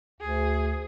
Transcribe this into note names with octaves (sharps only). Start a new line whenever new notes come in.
D2 G#4